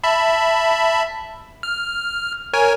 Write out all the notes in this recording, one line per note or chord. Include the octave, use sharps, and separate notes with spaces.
E5 A5 B5
F6
A#4 C#5 G#5